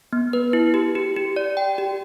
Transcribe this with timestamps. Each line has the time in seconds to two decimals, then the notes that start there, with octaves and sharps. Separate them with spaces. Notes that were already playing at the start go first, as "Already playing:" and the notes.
0.13 B3
0.33 B4
0.53 E4
0.74 G4
0.95 G4
1.16 G4
1.36 D5
1.57 G5
1.78 G4